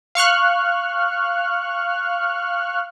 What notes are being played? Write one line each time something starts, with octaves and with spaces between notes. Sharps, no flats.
F5 C#6 F6 F#6